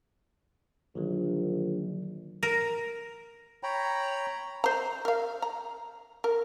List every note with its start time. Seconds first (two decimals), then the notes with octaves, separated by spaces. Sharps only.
0.95 A#1 D3 D#3 F#3
2.43 A#4
3.63 C#5 G5 A#5 B5
4.64 C5 A#5
5.05 A#4 F5
5.42 A#5
6.24 A#4